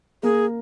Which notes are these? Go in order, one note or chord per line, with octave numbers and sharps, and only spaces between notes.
A#3 G#4